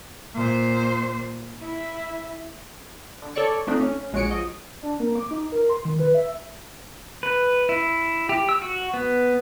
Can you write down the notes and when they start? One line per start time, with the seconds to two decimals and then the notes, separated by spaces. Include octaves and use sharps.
0.35 A#2 C5
1.62 E4
3.22 D3
3.36 A4 C#5 D5 C#6
3.67 F3 A3 C4 D4 D#4
3.81 C#4
4.13 A#1 G#3 F#4 C#5 C#7 D7
4.31 F3 D#5
4.82 D4
5.00 A#3
5.15 D6
5.31 D#4
5.52 A#4
5.69 C6
5.85 D#3
5.99 B4
6.14 E5
7.23 B4
7.69 E4
8.29 G4
8.49 E6
8.62 F#4
8.94 B3